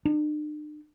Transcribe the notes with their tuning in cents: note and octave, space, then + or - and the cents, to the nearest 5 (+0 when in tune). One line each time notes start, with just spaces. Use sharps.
D4 +45